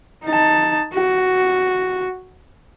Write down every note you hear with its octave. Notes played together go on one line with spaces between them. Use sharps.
D#4 A5
F#4